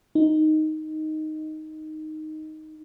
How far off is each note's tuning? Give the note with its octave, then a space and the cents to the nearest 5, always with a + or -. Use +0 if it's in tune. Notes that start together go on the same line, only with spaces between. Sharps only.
D#4 +0